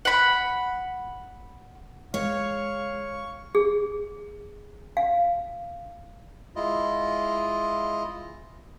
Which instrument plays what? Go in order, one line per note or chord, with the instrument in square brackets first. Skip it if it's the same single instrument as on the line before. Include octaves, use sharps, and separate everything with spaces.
[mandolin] F#5 B5
[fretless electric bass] G#3 [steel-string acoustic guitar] C#5 [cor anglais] F5 [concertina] C#6
[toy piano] G#4
F5
[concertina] G#3 E4 F4 D#5